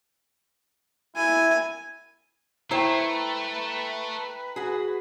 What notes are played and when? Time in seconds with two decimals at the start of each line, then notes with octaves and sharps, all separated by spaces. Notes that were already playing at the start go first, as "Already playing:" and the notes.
1.16 E4 G#5
2.71 A3 E4 B4 C5 G5 A#5
4.56 F#4 G#4